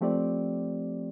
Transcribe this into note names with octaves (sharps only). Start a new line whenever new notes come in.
F3 A3 C4 G4 D5